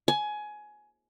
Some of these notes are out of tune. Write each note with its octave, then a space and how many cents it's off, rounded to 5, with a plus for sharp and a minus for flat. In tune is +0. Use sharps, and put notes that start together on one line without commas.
G#5 +20